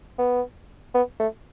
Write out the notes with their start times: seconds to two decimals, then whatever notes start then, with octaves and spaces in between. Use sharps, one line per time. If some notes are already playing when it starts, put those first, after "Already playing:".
0.18 B3
0.94 B3
1.19 A3